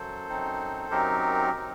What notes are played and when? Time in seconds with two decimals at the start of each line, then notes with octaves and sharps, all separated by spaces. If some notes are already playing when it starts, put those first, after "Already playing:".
Already playing: F#2 F#3 A4 C5
0.29 F#2 F#3 C4 D#4
0.91 F#2 F#3 C4 D#4 G4 A#4
1.54 F#3 C4 D#4